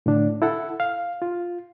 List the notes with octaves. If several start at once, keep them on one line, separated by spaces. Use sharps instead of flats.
A2 D3 D4
E4 A4 F#5
F5
F4